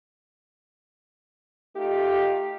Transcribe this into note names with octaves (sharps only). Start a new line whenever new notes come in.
A3 D#4 F4 G4